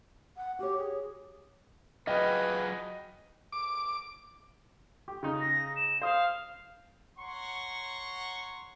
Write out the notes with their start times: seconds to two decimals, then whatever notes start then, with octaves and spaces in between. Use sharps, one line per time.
0.36 F#5
0.59 F#4 G4 C#5
0.77 G#4
2.07 F#3 F4 G#4 B4 D#5 G5
3.52 D6
5.08 G4
5.23 C#3 D#4
5.41 A#6
5.76 E7
6.02 C5 F5 D#6
7.18 C#5 F#5 A#5 C6 C#6